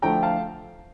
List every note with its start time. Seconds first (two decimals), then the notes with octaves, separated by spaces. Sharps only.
0.02 D3 F3 A3 G5 A#5
0.23 F5 A5